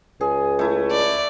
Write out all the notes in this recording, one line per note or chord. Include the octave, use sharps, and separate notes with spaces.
C#2 G#4
A3 E4
D5